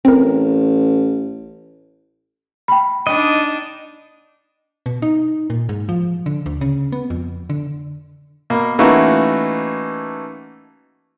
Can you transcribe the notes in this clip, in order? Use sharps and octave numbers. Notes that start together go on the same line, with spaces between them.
A1 C4 A#4
G5 B5
D4 D#4 D#5
B2
D#4
A#2
G#2
F3
D3
D2
C#3
B3
F2
D3
B2 A#3
E3 A3 A#3 C#4 D#4 F#4